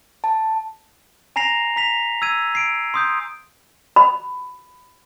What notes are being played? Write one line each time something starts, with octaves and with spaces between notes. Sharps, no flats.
A5
G#5 A#5 A#6 C7 F7
A#5 B6 F7
E6 G#6 D#7
C7 D7
C6 D#6 G6
B5